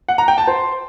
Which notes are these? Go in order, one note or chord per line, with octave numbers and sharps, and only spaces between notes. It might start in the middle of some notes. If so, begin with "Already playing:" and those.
F#5
A#5
G5
A5
C5